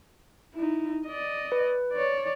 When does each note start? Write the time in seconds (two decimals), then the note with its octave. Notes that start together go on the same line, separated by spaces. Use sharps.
0.54 D#4 E4
1.07 D5 D#5
1.52 B4
1.93 C#5 D5